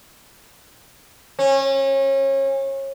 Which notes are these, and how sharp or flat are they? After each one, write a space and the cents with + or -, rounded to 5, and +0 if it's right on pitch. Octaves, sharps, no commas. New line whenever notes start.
C#4 -30